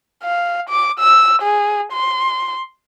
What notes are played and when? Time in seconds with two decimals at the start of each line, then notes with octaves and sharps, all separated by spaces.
0.23 F5
0.70 D6
0.99 E6
1.42 G#4
1.93 C6